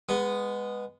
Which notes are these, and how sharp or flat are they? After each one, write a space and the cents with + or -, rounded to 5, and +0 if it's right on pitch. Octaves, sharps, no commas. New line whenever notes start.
G#3 -20 B3 +0